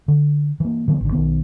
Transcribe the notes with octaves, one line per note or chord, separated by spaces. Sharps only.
D3
E3 A#3
D3 E3 F3 B3
G#1 D3
B1 D#3 B3